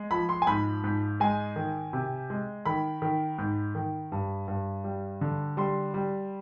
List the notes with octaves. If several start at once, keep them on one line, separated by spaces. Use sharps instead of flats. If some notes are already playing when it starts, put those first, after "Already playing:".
Already playing: G#3
F3 B5
C6
G#5
G#2 B5
G#2
G#3 G#5
D#3
C3
G#3
D#3 B5
D#3
G#2
D#3
G2
G2
G3
D3
G3 C6
G3